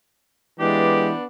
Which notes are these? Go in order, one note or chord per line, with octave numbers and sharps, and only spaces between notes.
E3 G#3 B3 D4 G4